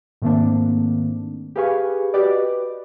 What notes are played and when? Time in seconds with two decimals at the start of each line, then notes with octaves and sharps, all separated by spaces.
0.22 G#2 D#3 A3 A#3 C4 D4
1.56 G4 G#4 B4 F5 G#5 C#6
2.13 F#4 G4 B4 D5 D#5